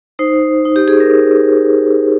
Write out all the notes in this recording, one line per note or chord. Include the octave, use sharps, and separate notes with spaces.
D#4 C5
D#4
G4
G#4
A#4